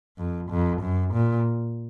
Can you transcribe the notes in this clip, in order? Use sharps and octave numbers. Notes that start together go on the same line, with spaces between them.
F2
F2
F#2
A#2